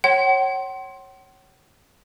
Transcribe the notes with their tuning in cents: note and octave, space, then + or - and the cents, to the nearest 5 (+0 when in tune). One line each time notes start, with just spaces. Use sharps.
C#5 -20 F#5 +45 C6 +15